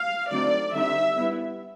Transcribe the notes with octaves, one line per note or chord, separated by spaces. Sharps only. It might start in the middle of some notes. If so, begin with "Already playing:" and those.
Already playing: F5
D3 F#3 A3 C4 D#4 D5
D3 G3 C4 D#4 E5
G3 B3 E4